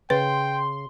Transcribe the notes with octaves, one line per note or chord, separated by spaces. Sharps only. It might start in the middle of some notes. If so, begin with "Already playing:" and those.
C#3 B4 G5 C6